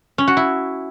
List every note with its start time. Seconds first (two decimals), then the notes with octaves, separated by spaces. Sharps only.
0.18 C#4
0.28 F#4
0.37 E4